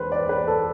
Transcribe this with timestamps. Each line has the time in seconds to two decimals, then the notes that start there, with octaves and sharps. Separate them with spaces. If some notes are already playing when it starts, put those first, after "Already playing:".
Already playing: E1 B4 C5
0.12 D5
0.29 B4
0.47 A4